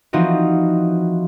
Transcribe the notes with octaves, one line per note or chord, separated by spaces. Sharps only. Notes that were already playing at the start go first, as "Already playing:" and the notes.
E3 F3 C4 D#4 F4 F#4